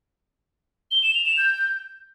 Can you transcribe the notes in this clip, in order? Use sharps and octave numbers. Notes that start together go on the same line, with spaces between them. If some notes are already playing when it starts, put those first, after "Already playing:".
G7
E7
F7
E7
G6